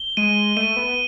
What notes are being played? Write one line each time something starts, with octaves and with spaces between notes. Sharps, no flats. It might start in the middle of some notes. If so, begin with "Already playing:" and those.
Already playing: G7
G#3 D#7
A3 D#7
B3